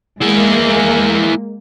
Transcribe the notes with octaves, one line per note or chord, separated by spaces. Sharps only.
G#3 A#3 E4 G#4